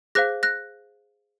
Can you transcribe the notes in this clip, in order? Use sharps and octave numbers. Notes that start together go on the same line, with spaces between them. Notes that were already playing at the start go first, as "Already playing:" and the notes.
G#4 C5 F5 F#6 A#6
F#6 A#6